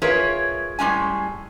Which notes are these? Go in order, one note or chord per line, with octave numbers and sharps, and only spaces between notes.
F4 G#4 A#4 B4 C#5 E5
A2 G3 G#3 C#4 G#5